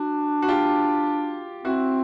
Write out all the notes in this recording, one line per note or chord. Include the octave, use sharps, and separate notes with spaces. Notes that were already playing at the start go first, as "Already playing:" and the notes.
Already playing: D4 F#4
F#4
F4 G4
C4 E4 F#4